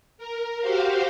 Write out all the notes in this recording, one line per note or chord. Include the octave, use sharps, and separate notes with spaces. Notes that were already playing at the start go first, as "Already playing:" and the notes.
A#4
F#4 G4 C5 F5